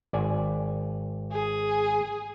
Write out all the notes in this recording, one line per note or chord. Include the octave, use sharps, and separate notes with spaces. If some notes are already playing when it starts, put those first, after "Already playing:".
G#1 D5 G#5
G#4